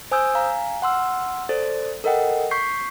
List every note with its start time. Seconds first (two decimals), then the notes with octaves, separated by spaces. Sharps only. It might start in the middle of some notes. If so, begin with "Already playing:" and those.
0.11 C5 G#5 D#6 E6 G6
0.35 F5 G#5 A#5
0.82 F#5 C6 E6 F6
1.49 A4 C5 D5 A6
2.04 A4 A#4 D#5 F#5 G5
2.51 C#6 G6 B6 C7